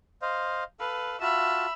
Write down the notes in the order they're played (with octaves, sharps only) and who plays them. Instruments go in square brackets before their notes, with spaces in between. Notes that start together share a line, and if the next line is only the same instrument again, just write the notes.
[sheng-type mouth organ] C5 D#5 F5
[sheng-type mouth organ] A4 F5 [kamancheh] B4
[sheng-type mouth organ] F4 F#4 A5 [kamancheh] E5 B5